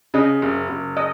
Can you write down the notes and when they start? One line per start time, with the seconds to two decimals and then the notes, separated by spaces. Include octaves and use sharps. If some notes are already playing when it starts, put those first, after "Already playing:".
0.14 C#3 D#5
0.42 F#1
0.69 F#1
0.97 D#5